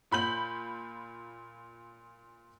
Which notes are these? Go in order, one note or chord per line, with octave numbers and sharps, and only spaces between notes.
A#2 B5 G6 F#7